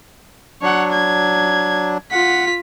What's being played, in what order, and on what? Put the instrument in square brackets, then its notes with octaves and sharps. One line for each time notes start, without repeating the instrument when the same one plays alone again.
[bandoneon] F#3 D4 [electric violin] C#5 F#5
[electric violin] G#6
[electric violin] F4 B6 [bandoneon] F#5